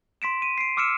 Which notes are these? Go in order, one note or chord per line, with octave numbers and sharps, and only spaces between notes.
C6 B6 D7 E7
D#7
C7 D7
D6 E6 F6 C#7 D7 E7